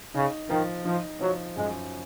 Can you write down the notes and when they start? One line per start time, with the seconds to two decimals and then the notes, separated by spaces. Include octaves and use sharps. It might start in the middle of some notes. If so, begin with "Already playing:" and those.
0.14 C#3 D#4
0.50 D#3 F3
0.85 F3 D#4
1.20 F3 F#3
1.56 F#2 G#3